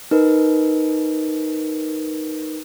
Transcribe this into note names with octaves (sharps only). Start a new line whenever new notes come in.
D#4 A#4 B4